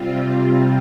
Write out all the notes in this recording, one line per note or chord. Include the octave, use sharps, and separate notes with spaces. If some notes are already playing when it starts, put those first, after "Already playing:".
Already playing: C3 G3 C4 F4